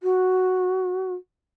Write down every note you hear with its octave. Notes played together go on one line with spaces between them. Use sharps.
F#4